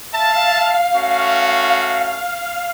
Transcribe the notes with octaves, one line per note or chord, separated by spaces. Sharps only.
E5 F5 A5
A3 C#4 F#4